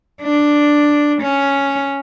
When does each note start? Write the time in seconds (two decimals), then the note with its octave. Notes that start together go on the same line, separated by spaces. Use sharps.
0.22 D4
1.22 C#4